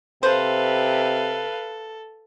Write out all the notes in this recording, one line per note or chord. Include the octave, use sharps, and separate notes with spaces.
C3 A4 B4 C5 F5